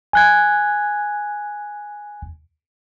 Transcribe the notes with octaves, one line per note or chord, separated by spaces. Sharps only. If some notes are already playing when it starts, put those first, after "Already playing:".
G#5 F#6 G#6